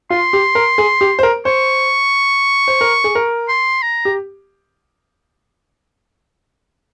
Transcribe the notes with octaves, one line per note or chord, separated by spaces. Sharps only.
F4 C6
G4
A#4
G#4
G4
C5
A#4
C5 C#6
C5
A#4
G#4
A#4
C6
A#5
G4